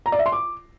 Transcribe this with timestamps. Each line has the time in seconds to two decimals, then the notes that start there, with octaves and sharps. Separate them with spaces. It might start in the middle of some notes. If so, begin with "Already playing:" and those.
0.06 A#5
0.12 D5
0.19 E5
0.26 C6
0.32 D6